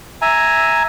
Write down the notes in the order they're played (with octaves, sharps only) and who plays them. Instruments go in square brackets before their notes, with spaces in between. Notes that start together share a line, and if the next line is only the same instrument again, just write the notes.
[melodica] E5 G#5 A#5